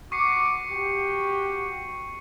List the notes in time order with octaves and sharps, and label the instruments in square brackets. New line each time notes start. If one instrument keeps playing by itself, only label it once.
[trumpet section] F#4 D6 [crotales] C#6 C7 C#7
[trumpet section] F#4 G4